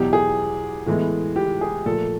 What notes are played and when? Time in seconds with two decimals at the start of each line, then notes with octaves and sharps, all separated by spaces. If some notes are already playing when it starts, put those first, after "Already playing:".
Already playing: E2 B2 F#3 G4
0.13 G#4
0.86 A2 E3 G#3 B3
1.36 G4
1.61 G#4
1.85 A#2 F3 A3 A4